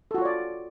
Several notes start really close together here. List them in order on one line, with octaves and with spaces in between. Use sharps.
A4 F#4 F4 C#5 D5